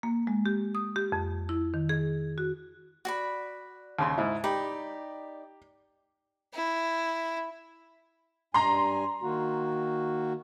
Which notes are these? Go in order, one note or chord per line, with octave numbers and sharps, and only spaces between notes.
A#3
G#3
G4
D#6
G4
F2
E4
D#3
G#4
F#4
F#4 D5 B5
D#2 C#3 C6
G#2 E4
D#4 G4 D5 B5
E4
G2 G#5 A#5 C6
D#3 A#3 F#4